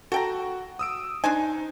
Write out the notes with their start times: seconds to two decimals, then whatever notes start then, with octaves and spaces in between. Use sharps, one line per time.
0.12 F#4 A4 G5 A#5
0.79 D#6 E6 D7
1.24 D4 D#4 C5 G#5